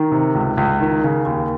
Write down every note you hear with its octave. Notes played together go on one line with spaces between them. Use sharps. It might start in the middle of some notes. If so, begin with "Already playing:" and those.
Already playing: D#3
C3
C#2
C#2
D#3
C#3
D#2